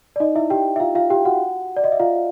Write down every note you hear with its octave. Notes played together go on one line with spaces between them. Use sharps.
D5
D#4 D#5
E4 E5
G4 G5
E5
F4 F5
F4 F5
G4 G5
F#4 F#5
D5
D#5
E5
F4 F5